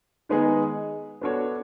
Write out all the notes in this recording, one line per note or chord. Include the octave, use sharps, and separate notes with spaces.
D#3 G#3 B3 D#4 G#4
B3 D4 F#4 A4 C#5